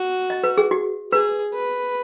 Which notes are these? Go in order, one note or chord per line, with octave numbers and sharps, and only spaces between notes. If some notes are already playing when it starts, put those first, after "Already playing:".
Already playing: F#4
D#5
B4
G#4
F#4
G#4 B4
B4